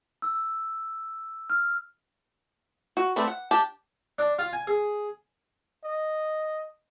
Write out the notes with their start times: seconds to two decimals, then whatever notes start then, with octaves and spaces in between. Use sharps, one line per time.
0.22 E6
1.50 F6
2.97 F#4
3.16 A3 C4 B4 D5
3.28 F#5
3.51 D4 G4 A5
4.19 D4
4.39 F4
4.53 G#5
4.67 G#4
5.84 D#5